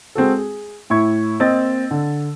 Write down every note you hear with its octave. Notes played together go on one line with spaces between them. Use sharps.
G#3 C4 F#4 A4
G#4
A2 E4 C#6 G#6
A#3 C4 D#5 E6 A6
D3